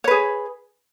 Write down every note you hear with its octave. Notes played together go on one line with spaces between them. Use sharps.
G#4 B4 C#5